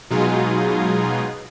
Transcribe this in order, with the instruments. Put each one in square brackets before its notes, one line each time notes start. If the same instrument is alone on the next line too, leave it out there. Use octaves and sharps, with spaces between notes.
[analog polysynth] B2 F#3 G#3 D#4 F4 G#4